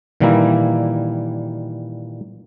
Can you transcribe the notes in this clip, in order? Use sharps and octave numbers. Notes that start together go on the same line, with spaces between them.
A#2 D#3 E3 G3 A#3 E4